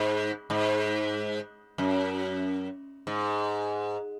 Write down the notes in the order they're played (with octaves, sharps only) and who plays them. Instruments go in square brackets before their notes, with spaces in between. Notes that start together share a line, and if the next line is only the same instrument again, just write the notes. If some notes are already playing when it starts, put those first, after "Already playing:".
Already playing: [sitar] G#2
G#2
F#2
G#2